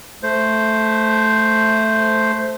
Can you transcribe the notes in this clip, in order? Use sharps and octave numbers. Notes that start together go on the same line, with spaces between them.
A3 C5